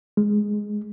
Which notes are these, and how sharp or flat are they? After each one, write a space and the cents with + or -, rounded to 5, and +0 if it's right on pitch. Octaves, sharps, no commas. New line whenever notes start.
G#3 +0